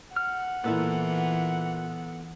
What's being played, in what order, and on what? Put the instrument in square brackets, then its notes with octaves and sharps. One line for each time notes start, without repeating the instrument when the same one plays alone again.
[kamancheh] F#5 [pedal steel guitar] F6
[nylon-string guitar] A#2 E4 [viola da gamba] E3 [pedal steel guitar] B3 A4